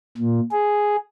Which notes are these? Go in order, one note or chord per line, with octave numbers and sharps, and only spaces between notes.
A#2
G#4